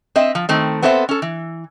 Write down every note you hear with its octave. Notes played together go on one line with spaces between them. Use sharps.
C4 D#5 E5
F3
D#3 A3 C4
B3 C4 A4 C5 D5 E5
C#4 A4
E3